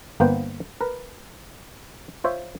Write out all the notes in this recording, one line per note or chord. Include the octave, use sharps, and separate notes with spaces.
G1 A#3 B3 B4 C5 G5
A#4 B4
F4 C5 C#5 E5